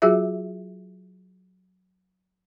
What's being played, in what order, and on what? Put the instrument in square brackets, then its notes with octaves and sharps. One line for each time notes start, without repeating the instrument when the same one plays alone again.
[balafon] F#3 F4 F#4 G#4 E5